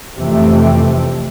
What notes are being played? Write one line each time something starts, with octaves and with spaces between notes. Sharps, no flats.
F2 C3 E3 A3 C4